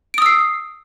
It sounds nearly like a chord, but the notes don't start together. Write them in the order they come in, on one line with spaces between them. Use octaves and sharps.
D7 D#6 E6 C7